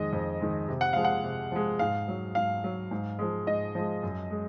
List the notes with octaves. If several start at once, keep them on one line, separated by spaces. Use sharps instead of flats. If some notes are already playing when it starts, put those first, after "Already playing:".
Already playing: F2 D#3 G#3 D#5
F2
D#3 G#3
C3
F#5
F3 G#3 F5
F#5
C3
F3 G#3
G#2 F5
F#3
G#2 F5
F#3
G#2
F3 G#3
G#2 D#5
F3 G#3
F#2
G#3